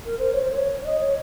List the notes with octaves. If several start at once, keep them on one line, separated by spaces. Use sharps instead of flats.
A#4
C5
C#5
C5
C#5
C#5
D#5
C#5